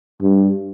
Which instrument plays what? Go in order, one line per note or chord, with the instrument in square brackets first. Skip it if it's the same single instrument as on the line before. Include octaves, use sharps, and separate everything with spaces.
[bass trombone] G2